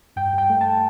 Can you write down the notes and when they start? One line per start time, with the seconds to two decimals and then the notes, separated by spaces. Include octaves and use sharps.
0.16 G2 G5
0.33 G2 G5
0.50 A3
0.61 A5